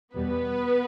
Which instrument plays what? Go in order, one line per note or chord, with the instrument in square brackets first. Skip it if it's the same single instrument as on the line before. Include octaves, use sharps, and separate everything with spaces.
[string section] E2 B2 G3 B3 B4